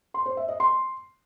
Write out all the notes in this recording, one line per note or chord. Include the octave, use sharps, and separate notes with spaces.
C6
C5
E5
D#5
C6